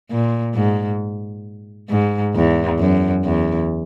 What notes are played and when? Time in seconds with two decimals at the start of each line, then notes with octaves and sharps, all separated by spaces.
0.11 A#2
0.55 G#2
1.90 G#2
2.35 E2
2.79 F#2
3.25 E2